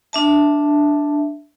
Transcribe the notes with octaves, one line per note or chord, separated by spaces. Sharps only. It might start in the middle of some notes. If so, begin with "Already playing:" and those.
D4 E5 A5